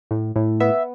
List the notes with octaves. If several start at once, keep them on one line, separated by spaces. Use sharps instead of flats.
A2
A2
B3 E5